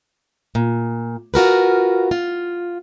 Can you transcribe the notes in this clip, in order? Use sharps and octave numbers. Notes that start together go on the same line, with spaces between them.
A#2
F4 F#4 A#4 B4
F4